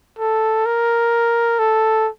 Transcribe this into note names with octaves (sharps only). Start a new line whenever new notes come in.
A4
A#4
A4